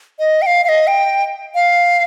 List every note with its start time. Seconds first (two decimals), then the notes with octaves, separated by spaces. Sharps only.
0.19 D#5
0.42 G5
0.46 F5
0.64 F5
0.69 D#5
0.87 G5
1.55 F5